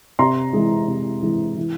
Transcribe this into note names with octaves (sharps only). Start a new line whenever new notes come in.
C3 A#5 C6
E3 G#3
C3
E3 G#3
E3